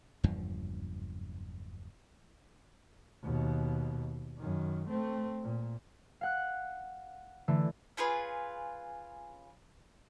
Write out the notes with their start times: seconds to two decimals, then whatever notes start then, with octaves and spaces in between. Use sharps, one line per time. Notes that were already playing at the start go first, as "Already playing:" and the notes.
0.24 F#1 E2 G2 F3
3.22 D#2 B2
4.38 F#2 D#3
4.88 A3 C4
5.43 A#2
6.21 F5 F#5 F#6
7.48 D3 E3 A3
7.97 C#4 F4 G#4 B4